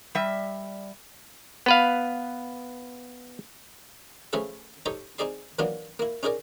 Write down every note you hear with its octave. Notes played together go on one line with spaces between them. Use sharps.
G3 E5
B3 B4 F5
F3 A3 C#4 G#4 B4 E5
D#4 G4 A4 C5 C#5
C4 D#4 G#4 D5 C6
E3 F#3 A#3 B3 D4 F4
A#3 E4
C#4 D#4 G#4 A#4 D5